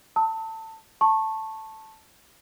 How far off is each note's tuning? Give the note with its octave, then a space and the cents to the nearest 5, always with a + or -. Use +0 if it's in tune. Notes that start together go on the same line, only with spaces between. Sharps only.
A5 +20 E6 -45
A5 +0 C#6 -20